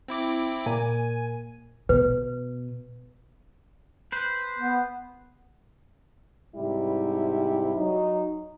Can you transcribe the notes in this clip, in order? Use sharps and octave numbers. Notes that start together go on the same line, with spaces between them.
C4 E4 D6
A#2 G#5
B2 B4
B4 C5
B3
G#2 C3 G3 E4
F#3 D#4